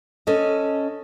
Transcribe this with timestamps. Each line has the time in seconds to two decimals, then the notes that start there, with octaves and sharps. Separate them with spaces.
0.27 C#4 A4 D#5